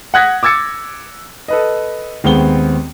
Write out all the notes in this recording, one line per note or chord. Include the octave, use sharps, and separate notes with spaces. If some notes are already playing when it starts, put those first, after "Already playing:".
F#5 D#6 F#6 G#6 A#6 B6
D6 E6 G#6 A6 C#7
A4 B4 D#5
D#2 G#3 B3 C4 G7